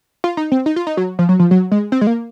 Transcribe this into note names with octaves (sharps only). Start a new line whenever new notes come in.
F4
D#4
C4
D#4
F4
D#4
F#3
F3
F#3
F3
F#3
G#3
C4
G#3
A#3